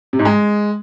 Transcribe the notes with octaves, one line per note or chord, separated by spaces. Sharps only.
C3
G#2
G#3